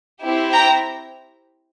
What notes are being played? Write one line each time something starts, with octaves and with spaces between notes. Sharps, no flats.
C4 E4 G4
G5 A#5